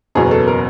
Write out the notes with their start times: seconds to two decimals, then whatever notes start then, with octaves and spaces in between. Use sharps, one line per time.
0.15 F#1 E2 B2 F#3 G#4
0.31 A4
0.48 A#4